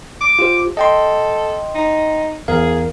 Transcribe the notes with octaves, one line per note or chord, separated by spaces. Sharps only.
D6
F4 G4 C5
A4 D#5 G5 C6
D#4
E2 G#4 A#4 F5